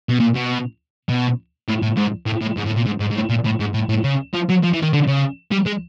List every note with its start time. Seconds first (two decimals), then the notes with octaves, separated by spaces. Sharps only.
0.09 B2
0.20 A#2
0.35 B2
1.09 B2
1.68 A2
1.82 A2
1.97 G#2
2.26 A2
2.41 A2
2.57 G#2
2.66 A2
2.76 A#2
2.85 G#2
3.00 G#2
3.11 G#2
3.15 A2
3.30 A#2
3.45 A2
3.60 G#2
3.74 A2
3.89 A2
4.04 C#3
4.34 F3
4.49 F#3
4.63 F3
4.73 E3
4.82 D#3
4.93 D3
5.08 C#3
5.52 G3
5.66 G#3